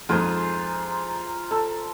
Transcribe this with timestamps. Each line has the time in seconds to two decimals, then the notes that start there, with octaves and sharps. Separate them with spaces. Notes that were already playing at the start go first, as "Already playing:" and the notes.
0.09 F2 G#2 F4 G#4 C5 A#5
1.51 A4 E6